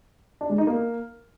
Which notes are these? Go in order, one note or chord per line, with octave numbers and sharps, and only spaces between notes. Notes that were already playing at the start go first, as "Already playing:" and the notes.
D4
G#3
D#4
A#3